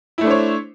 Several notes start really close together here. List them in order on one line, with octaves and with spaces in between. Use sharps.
E4 A3 D4 C5 C#5